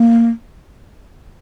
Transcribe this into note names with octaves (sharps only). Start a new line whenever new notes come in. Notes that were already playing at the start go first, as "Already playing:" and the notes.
Already playing: A#3